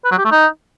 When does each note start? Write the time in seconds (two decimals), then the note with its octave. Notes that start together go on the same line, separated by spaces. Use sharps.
0.05 B4
0.11 F#3
0.18 G4
0.25 A3
0.31 D#4